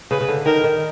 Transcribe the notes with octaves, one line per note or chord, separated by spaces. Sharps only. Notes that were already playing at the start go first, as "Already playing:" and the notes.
C#3 B4
C#3
D3
D#3 A#4
D#3